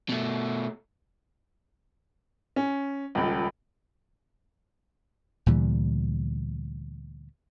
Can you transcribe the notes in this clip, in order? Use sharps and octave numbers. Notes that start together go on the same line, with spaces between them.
B2 A3
C#4
D#1 C#2
D2 A#2 E3 G3